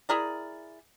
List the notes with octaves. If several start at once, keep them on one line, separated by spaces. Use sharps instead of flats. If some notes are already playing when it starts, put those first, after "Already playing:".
E4 G#4 A#4 D5